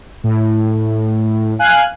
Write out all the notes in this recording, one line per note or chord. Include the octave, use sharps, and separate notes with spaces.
A2
F5 G#5 F#6